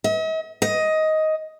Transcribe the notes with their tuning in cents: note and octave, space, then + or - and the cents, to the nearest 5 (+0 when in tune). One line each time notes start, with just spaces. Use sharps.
D#5 +45
D#5 +10